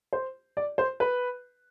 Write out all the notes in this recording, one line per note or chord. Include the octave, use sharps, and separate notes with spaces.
C5
D5
C5
B4